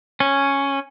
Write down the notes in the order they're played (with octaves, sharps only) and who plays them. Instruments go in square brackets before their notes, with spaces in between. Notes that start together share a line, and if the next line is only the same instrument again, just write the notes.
[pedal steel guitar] C#4